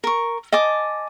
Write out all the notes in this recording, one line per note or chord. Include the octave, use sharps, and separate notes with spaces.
A#4 C#6
D#5 G#5 A5 D6